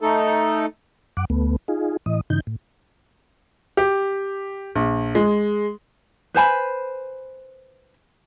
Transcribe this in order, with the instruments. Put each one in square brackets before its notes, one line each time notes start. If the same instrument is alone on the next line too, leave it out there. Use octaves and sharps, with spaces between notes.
[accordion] A3 D#4 A4
[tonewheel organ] F#2 F#5 D6
D2 A3 B3
D#4 F4 G#4
A2 E3 D#5
G2 C#3 E3 D#4 G6
A2
[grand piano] G4
A#1
G#3
[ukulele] B4 C5 G#5 B5